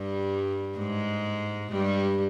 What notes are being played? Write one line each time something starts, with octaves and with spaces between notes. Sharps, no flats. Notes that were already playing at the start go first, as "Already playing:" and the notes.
Already playing: G2 G3
G#2 G#3
G2 G3